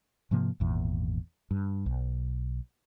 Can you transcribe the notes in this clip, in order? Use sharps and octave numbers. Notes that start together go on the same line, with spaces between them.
G#2 C3 F3 A#3
G#1 E2 A#2
G2
B1